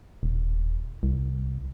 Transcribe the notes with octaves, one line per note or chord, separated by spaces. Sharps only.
D#1
C2